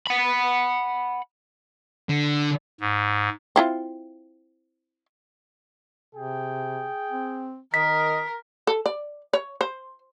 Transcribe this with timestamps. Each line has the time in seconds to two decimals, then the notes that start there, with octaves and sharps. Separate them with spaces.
0.07 F#5 B5
2.10 D3
2.81 G#2
3.56 C4 E4 F4
6.15 C3 G#4 G5
7.11 C4
7.74 D#3 A#4 D#5 B6
8.67 A4
8.86 D5
9.33 C#5
9.61 C5